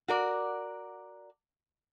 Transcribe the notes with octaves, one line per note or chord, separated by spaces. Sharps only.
F#4 A#4 D5